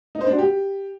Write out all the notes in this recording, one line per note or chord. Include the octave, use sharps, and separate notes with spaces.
D#4
C5
D4
F#4
G4